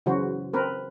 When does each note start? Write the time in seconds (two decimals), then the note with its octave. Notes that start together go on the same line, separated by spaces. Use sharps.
0.06 C#3 E3 F#3 F#4 C5
0.53 C4 A#4 B4